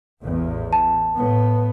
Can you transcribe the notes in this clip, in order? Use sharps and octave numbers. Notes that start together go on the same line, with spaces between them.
A1 E2
A5
A2 B3